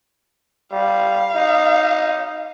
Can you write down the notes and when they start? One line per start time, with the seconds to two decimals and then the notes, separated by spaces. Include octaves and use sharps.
0.72 G3 F5
1.35 D#4